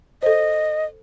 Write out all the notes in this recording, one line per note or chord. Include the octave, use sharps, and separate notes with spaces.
A4 C5 D#5